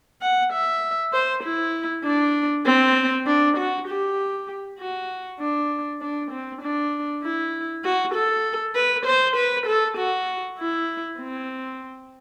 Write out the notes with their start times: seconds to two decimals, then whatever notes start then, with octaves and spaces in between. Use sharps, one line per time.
0.22 F#5
0.53 E5
1.13 C5
1.44 E4
2.04 D4
2.66 C4
3.27 D4
3.57 F#4
3.88 G4
4.79 F#4
5.40 D4
6.01 D4
6.31 C4
6.62 D4
7.23 E4
7.84 F#4
8.14 A4
8.75 B4
9.06 C5
9.36 B4
9.66 A4
9.97 F#4
10.58 E4
11.19 C4